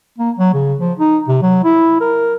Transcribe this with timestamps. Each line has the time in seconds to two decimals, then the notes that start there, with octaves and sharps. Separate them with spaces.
0.18 A#3
0.39 F#3
0.54 C#3
0.79 F3
1.00 D#4
1.28 C3
1.42 F#3
1.65 E4
2.01 A#4